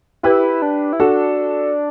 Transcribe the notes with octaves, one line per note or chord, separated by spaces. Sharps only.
E4 G4 B4
D4
E4
D4 F#4 A4